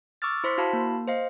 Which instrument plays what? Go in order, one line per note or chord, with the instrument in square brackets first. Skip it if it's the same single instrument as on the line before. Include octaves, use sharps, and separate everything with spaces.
[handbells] C#6 D6 E6 F6 A6
E4 C5 C6 B6
E4 F#4 F5 A5 B5
A#3
C5 D#5 F5